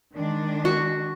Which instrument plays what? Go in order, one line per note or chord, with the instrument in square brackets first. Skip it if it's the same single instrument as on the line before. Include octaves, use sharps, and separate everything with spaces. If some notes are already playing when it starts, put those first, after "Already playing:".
[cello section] D#3 G#3 D4
[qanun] F#4